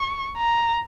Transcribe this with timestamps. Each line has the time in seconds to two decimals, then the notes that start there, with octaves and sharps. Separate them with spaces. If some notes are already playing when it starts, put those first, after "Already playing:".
Already playing: C#6
0.38 A#5